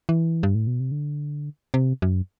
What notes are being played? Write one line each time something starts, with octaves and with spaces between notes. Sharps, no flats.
E3
G2
A2
B2
C3
D3
C3
F#2